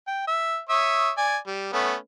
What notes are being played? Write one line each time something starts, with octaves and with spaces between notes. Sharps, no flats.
G5
E5
C#5 E5 D#6
D5 G#5
G3
A3 B3 C#4